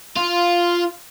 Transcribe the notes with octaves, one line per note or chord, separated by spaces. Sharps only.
F4